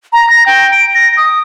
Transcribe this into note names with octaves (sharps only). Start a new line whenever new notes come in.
A#5
A#6
G5
D7
A#6
D#6